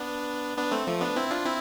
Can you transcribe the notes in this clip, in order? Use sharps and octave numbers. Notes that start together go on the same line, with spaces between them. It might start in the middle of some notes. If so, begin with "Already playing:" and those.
Already playing: B3 D4
B3 D4
A3 C4
F3 A3
B3 D4
C4 E4
D4 F4
C4 E4